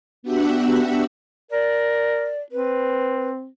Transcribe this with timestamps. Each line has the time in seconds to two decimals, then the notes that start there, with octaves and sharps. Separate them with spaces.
0.23 B3 D4 F#4 G4 E5 F#5
1.51 A#4 D5
2.52 C4 B4